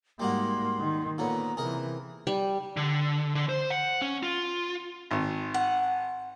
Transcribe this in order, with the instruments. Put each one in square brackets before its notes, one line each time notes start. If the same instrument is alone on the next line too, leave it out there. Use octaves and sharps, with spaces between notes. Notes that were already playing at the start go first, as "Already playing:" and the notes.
[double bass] G#2 A#3 [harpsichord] G3 D#4 F#4 [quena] C6
[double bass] D#3
[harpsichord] A#2 D3 C#5 [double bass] B3 [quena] A#5
[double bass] C3 E3 [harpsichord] G#4 A#4 D#5
[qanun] G3
[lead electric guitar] D3
D3
C5
F#5
C#4
F4
[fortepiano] G#1
[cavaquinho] F#5